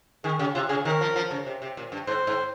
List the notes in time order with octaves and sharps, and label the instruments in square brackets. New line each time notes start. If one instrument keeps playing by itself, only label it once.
[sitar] D#3 [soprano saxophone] G#4
[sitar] C#3 [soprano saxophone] G4
[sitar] C3 [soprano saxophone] F4
[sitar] C#3 [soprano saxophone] G#4
[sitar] D#3 [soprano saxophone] A#4
[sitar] F3
F3
C#3
C3
C3
A#2
G2
[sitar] G#2 [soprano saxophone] C5
[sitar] G#2